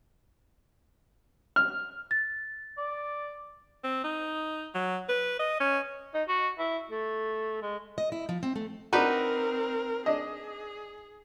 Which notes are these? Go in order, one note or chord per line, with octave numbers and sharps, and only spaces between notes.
F6
A6
D5
C4
D#4
F#3
B4
D#5
C#4
D#4
F#4
E4
A3
G#3
D#5
E4
F3
C4
A3
C4 D4 D#4 F#4 A#4 B4
D4 G#4 D#5